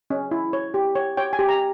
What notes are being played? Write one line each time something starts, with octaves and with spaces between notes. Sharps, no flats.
C#4
E4
C#5
G4
C#5
C#5 G5
G#5
G4
A#5